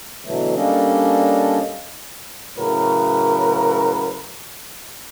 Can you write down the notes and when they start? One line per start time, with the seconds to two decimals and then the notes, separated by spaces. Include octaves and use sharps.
0.25 B2 D3 E3 F#3 A3
0.55 G3 A#3 C#4 D4 A4 D#5
2.59 A2 C#3 F#3 A#4 B4